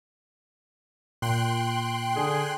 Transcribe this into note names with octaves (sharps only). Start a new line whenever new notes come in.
A#2 G5 C6 F#6
D3 G#4